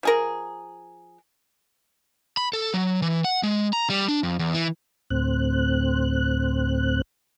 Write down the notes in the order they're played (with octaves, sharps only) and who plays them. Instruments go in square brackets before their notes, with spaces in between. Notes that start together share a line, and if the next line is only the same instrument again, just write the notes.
[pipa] F3 G#4 A#4
[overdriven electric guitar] B5
A4
F#3
E3
F#5
G#3
A#5
G3
D4
F2
E2
E3
[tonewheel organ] D2 A2 C4 F#6